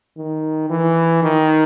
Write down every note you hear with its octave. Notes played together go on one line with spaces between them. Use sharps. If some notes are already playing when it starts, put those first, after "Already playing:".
D#3
E3
D#3